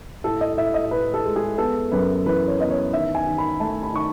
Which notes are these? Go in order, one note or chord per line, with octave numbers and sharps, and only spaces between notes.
A2 A4
D#5
A2 E5
D#5
A2 B4
A4
G#3
G#4
B3 A4
F#2 B4
E3 B4
C#5
B3 D#5
C#5
D#3 E5
G#5
D#3
B5
A3 A5
B5
D#3 C#6